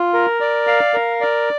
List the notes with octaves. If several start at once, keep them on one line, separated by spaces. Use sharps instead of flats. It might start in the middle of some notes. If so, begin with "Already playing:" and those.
Already playing: F4
A#4
D5
F5
A#4
D5